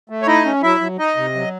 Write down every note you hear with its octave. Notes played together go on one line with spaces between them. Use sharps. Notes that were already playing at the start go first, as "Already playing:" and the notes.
A3
C#5
D#4 E4 D#5
C#4
F#3 E4 E5
F#3
D#4 D#5
C3
F#3